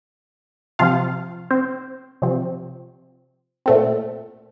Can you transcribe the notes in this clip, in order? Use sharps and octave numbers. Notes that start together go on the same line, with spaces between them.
C3 F3 C4 F4 F5
C4 C5
C3 F3 C4
A#2 A3 C4